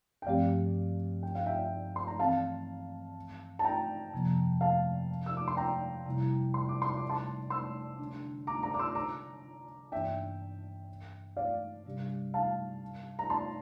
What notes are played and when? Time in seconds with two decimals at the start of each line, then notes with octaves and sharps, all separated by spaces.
0.22 G5
0.26 G2 F3 A3 C4 G4 D5 F5
1.23 G5
1.35 F5
1.46 E5 G5
1.96 C6
2.08 A#5
2.19 E3 A3 C4 F5 A5
3.59 A5
3.64 G5 A#5
4.13 F2 C3 F3 A#3
4.61 F5 A5
5.26 E6
5.37 D6
5.48 C6
5.57 G5 A#5
6.06 C3 G3 A#3 E4
6.54 C6
6.69 D6
6.82 C6
6.97 D6
7.09 A5 C6
7.50 C6 E6
7.99 D3 A3 D4
8.47 A#5 D6
8.63 A#5 D6
8.74 D6
8.79 C6 E6
8.95 A#5 D6
9.92 G2 E3 A#3 D4 E5 G5
11.37 D5 F5
11.86 C3 G3 D4 G4
12.34 F5 A5
13.19 A#5
13.30 A5 C6